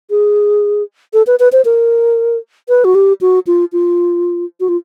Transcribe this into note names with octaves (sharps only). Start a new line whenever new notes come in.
G#4
A4
B4
B4
C5
A#4
B4
F#4
G4
F#4
F4
F4
F#4
F4